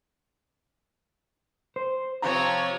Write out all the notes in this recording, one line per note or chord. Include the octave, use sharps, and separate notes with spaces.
C5
C3 F3 C4 C#5 A#5